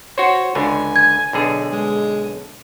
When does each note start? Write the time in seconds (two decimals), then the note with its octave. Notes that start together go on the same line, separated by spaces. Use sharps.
0.18 F#4 C5 C#5
0.55 C#2 D3 G#5
0.96 G#6
1.33 B1 D3 G#4
1.72 G#3